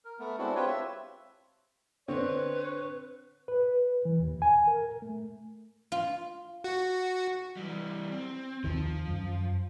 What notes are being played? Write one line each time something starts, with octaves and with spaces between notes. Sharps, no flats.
A#4
A3 B3
G#3 C4 D4 E4 F#4
C4 F4 G4 B4 C#5
E5
D3 C4 B4 C#5
B4
E3
D#2
G#5
A#4
A3
F4
F#4
E3 G3
C4
D#2 D#3 F3
F#2